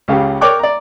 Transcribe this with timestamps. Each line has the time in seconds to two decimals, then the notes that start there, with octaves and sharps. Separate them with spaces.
0.08 C#2 C#3 G4
0.41 A#4 C#5 D5 G5 D6 F#6
0.59 D5 A#5